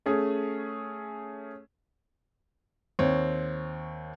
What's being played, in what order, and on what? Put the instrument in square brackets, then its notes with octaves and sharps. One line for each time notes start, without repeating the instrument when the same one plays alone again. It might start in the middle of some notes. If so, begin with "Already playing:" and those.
[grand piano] A3 C#4 G#4
[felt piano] D#2 C4 C#5